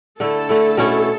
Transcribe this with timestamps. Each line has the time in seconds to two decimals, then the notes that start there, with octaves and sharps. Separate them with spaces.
0.20 D3 A3 E4 A4
0.49 D3 A3 E4
0.77 B2 A3 C#4 E4